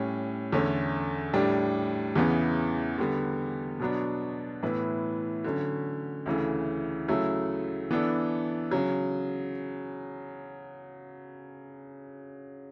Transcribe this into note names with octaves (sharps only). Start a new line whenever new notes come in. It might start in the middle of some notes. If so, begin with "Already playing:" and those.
Already playing: A2 G3 C#4
E2 D3 A3 C#4
A2 G3 D4
E2 C#3 E3 B3
D3 G3 B3
B2 F#3 B3 D4
A2 E3 B3 E4 B4
D3 F#3 C#4
D2 C#3 E3 A3
C#3 F#3 A3 E4 A4
E3 B3 D4 A4
C#3 F#3